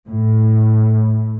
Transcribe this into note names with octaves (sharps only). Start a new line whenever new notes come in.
A2